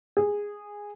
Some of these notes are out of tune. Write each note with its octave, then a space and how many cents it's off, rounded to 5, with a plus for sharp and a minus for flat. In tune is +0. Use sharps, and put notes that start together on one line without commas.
G#4 -10